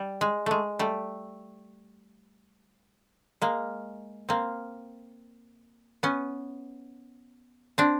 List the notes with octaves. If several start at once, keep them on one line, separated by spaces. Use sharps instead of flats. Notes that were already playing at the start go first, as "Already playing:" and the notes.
Already playing: G3
G#3
G#3 A3
G3 A3
G#3 A#3
A#3 C4
B3 C#4
C4 D4